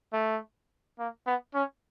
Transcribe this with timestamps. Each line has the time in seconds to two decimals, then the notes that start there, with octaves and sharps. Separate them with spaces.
0.13 A3
0.99 A#3
1.27 B3
1.54 C#4